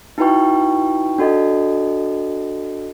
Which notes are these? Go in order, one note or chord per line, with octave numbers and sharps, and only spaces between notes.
D#4 E4 F#4 B4 G5 C#6
D4 F#4 A4 D#5